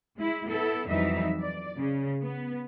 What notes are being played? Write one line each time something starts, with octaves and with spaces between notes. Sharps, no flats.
G#3 E4
B3 E4 A4
F2 E3 F#3 G3 D#4 E5
D5
C#3
B3